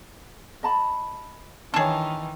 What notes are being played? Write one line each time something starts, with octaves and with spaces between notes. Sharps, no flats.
D#5 A5 B5
D#3 E3 D4 G#4 A4 C#5